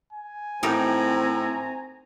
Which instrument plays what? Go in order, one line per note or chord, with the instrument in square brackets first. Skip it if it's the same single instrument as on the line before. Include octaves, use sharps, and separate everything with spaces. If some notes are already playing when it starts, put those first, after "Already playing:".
[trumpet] G#5
[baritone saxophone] A2 [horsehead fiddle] C4 A#5 [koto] D#4 G4 A#4